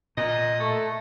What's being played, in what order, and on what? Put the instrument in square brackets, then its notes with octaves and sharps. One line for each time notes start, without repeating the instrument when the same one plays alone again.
[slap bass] A#2 [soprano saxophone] D#5
[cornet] A3 [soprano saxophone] A4